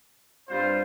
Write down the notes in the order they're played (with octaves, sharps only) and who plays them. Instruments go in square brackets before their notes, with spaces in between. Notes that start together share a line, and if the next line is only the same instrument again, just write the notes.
[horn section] G2 G3 C4 F4 C5